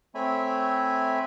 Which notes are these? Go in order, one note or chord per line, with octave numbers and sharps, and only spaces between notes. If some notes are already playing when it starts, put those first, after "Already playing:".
A3 C4 C#5 E5 G#5 B5